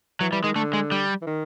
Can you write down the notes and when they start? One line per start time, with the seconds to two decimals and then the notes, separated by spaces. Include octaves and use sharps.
0.21 E3 F#3
0.32 E3 G3
0.44 D#3 G#3
0.55 D3 A3
0.73 G#3
0.92 G3
1.22 E3
1.27 D#3